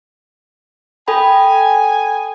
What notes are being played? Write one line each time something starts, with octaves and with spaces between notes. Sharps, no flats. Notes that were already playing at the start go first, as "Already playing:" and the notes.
A4 G5 G#5 B5